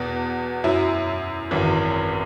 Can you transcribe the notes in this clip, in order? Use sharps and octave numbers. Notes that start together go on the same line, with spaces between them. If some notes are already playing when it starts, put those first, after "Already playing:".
Already playing: E2 B2 B3
F#2 F#3 E4
G#1 F#2 E3